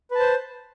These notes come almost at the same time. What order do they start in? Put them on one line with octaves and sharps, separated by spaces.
B4 A5 C5